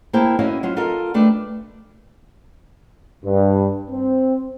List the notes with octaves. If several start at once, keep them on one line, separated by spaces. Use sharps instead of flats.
A#3 E4 C5 E5 G5 A5
C#4 E4 F#4 D#5 F5
F#3 C#4 F4
F4 A4 A#4 D#5 F5
G3 A3 D4 B4 D5
G2
C4